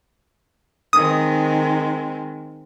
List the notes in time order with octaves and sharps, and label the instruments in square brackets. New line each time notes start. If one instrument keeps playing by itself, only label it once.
[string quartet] D#3 G#3 C4 [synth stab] D#6